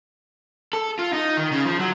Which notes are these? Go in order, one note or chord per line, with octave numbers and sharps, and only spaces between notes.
A4
F4
D#4
D#3
C#3
F3
F#3